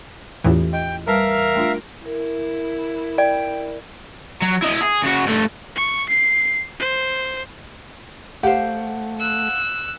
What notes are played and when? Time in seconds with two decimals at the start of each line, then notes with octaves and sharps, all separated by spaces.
0.44 E2 A2 E3 C#4 F4 G4
0.73 D#5 G5
1.07 G3 A#4 B4 E5 F5 A5 A#5
1.55 A3 D4 F4
2.06 E4 A#4
3.18 D5 G5
4.42 F#3
4.62 E4 D#5
4.81 G#4
5.03 C#3 F#4
5.26 G2 A3
5.75 C#6
6.09 C7
6.79 C5
8.43 A3 G4 C5 F5 F#5
9.19 E6 F#6